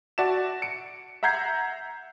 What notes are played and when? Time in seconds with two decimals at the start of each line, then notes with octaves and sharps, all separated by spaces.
0.18 F#4 D5 E5 A5 E7
0.62 C#7 D7
1.23 E5 F#5 A#5 G6 G#6 C7